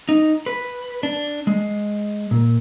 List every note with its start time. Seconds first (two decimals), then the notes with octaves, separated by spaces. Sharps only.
0.09 D#4
0.46 B4
1.03 D4
1.47 G#3
2.31 A#2